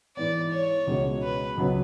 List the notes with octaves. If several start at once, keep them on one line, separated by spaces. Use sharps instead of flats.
G#2 E3 B3 D5
C#5
C#2 B2 G#3 C#4
B4
C#2 B2 F#3 B3